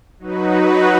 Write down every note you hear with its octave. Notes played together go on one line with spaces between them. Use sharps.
F#3 D#4 F#4 B4